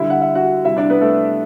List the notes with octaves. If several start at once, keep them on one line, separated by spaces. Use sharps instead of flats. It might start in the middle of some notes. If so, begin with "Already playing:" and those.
Already playing: D3 G3 E4 E5
F#5
E5
F#4 F#5
C3 G3 E4 E5
D4 D5
B3 B4
A3 A4